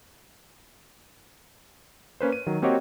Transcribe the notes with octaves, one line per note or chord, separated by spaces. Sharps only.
A#3 C#4 B4 C5
D#7
D#3 F#3
A#3 C4 F#4 G4 C#5 D#5